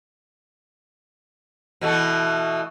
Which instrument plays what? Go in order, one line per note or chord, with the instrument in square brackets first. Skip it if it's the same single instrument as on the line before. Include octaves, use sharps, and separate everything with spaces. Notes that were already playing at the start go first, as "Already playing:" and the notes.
[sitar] B2 E3 A3